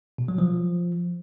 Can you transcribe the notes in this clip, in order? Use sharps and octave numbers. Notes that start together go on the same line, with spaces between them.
B2
F#3
F3